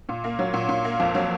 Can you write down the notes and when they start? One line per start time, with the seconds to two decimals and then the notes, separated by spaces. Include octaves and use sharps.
0.09 A#2
0.24 A#3
0.39 F#3
0.53 A#2
0.69 A#2
0.85 A#3
1.00 F2
1.15 F#3